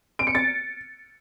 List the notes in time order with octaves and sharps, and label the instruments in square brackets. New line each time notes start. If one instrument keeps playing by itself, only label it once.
[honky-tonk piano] D7
C#7
A6